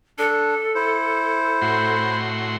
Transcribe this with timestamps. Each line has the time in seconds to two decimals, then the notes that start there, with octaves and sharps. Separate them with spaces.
0.18 D4 A4
0.75 E4 C5
1.62 A2 F#4 C6